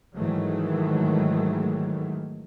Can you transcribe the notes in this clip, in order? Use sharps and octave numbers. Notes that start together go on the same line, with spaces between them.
G#2 D#3 E3 F#3 G#3 A3